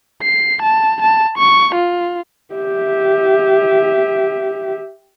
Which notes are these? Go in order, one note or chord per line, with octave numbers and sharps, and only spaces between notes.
C7
A5
A5
C#6
F4
G4 E5